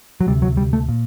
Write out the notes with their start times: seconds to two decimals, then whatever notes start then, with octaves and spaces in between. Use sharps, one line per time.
0.21 F#3
0.27 D2 C3 G3
0.42 F#3
0.57 G3
0.73 A3
0.89 A#2